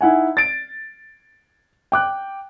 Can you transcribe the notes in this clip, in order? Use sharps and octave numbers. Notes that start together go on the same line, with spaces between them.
D#4 E4 F#5 G#5
A6 D7
G5 D6 F#6